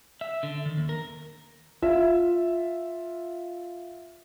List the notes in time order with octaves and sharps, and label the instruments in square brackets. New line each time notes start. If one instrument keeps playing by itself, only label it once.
[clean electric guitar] E5
D3
D#3
D#2
A#4
[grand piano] F4 E5